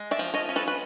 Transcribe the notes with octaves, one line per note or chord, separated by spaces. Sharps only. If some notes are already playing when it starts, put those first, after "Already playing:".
Already playing: G#3
D5 E5
F3
C#5 D#5
C#4
A4 B4
B4